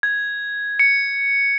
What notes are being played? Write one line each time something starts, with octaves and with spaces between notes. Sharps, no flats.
G#6
C#7